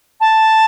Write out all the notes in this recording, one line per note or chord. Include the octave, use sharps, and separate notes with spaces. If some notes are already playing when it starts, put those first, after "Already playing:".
A5